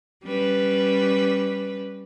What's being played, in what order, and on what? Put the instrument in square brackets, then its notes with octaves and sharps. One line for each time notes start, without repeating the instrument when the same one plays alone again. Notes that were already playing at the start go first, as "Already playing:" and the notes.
[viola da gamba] G3 C#4 B4